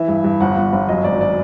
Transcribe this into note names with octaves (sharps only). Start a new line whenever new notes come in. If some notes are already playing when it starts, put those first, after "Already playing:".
Already playing: E3 E5
G2
G2
G1 F#5
G1
G1
F#2 D#5
G#1 D5
D5